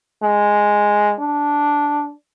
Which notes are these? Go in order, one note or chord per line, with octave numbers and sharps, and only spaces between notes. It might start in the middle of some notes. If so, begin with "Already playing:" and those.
G#3
D4